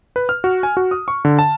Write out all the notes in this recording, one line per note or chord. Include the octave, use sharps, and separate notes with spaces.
B4
F6
F#4
G#5
F#4
D#6
C#6
D3
A5